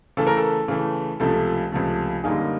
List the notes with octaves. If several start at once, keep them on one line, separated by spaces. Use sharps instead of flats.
C#3 E3 A3 A4
A#4
A4
C#3 E3 A3
C#2 C3 F3 A3 A4
C#2 C3 F3 A3
F#2 D3 G3 A#3 D#4 G#4